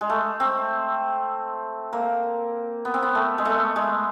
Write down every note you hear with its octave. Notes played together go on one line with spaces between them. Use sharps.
G#3
A3
C4
A#3
B3
C4
B3
A3
G#3
A3
G#3